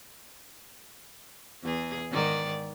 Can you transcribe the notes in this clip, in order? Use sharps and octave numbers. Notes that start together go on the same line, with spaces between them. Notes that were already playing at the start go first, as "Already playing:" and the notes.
E2 G#4
G#2 D#3 D5